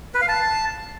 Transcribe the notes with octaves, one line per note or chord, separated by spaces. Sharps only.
B4
F5
A5